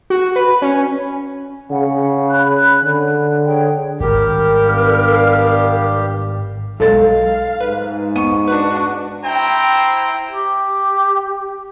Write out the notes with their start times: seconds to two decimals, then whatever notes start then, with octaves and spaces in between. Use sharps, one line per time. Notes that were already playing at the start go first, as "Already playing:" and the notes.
0.10 F#4
0.36 B4
0.62 C#4
1.71 C#3 F#5
2.30 C#5 B5 F#6
2.84 D3
3.46 G#4 C#5 G5
4.00 G#1 G3 G4 A#4
4.66 B3 D4 F5
6.80 B1 F#3 G#3 A4 F5 A6
7.61 G#2 B4
8.16 B3 C#6 D#7
8.48 D4 F#4 B4
9.24 E4 C5 G5 A#5
10.31 G4